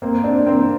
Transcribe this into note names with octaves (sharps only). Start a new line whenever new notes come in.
A#3 C4
C4 D4
A#3 C4